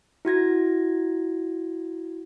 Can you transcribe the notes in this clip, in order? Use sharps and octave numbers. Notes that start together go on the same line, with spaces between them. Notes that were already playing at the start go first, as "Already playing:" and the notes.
E4 F#4 G#6 A#6